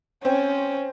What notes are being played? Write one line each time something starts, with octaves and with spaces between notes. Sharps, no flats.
C4 C#4